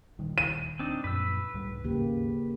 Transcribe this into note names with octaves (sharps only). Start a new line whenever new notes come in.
D#1 D#3 G3
D#7
C4 D4 D#4
F#2 A#2 F3 B4 E6
C#2 A2 G3
G#1 D#2 C#3 A#3 G4